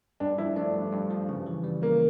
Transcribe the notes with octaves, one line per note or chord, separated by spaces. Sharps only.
G2 D4
F3 E4
A3 D4
G2
G2
F3
C#3
E3
G3
C#3 A#3